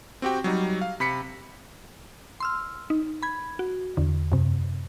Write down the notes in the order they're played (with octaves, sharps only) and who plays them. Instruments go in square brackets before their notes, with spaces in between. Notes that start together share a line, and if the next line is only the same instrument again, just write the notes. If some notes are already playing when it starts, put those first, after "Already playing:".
[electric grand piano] C4 F#4 G4 G5
F#3 G3 D#4
F5
C3 B5 B6 C#7
[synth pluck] C6 E6 F6
D#4
B5 G#6
F#4
E2 D3
F#2 C3